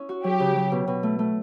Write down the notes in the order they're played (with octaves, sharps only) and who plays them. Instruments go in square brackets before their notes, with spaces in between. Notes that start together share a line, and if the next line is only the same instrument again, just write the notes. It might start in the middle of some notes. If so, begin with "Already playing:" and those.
Already playing: [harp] C#4 E4
F#4
[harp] F#3 [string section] G4
[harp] C#3
F#3
B2
B2
A3
A3